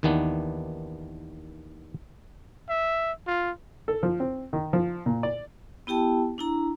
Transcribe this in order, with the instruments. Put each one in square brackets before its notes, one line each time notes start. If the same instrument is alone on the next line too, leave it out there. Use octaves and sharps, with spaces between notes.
[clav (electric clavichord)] D#2 D#3 E3 B3 D4
[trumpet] E5
F4
[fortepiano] A4
F3
C4
D#3
F3
A#2
D5
[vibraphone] B3 E4 G4 G5 A5
D4 E4 A#5